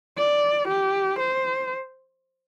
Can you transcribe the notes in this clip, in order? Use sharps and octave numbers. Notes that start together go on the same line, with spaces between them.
D5
G4
C5